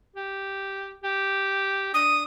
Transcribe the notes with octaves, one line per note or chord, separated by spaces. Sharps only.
G4
G4
D4 D#6